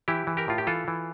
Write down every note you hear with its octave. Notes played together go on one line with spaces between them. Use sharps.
E3 E4 G4
E3
G4 A#4
A2 F4
G4
E3 F4 A4
E3